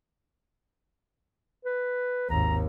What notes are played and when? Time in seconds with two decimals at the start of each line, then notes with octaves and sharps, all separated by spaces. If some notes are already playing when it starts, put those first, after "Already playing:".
1.65 B4
2.30 G#1 D#2 A#5